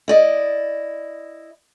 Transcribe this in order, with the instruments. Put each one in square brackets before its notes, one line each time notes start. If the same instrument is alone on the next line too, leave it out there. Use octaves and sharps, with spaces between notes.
[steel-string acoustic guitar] E4 D5 D#5